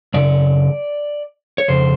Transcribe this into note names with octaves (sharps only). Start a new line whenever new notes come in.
F#2 C#3 D5
C#5
F2 C#3 C5